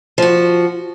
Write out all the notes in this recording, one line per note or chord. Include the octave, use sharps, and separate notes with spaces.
F3 F#4